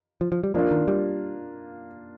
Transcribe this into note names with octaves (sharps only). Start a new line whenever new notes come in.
F3
F3
G3
F3 A#3 D4 F4
D#3
G3